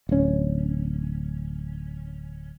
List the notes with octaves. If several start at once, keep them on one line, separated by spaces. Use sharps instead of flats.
D1 C#4